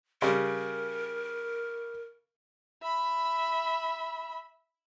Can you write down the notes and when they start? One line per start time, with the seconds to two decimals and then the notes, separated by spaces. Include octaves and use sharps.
0.22 C#3 G3 A#4
2.82 E5 B5